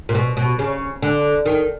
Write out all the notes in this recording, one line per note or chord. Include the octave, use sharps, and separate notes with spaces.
A#2
B2
B2
C#3
D3
D#3